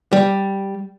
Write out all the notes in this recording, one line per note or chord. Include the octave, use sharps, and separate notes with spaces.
G3